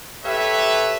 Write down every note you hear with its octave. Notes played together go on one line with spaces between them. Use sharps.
G4 A4 B4 C#5 E5